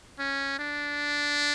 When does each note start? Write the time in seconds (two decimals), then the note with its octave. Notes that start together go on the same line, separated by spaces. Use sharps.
0.19 C#4
0.59 D4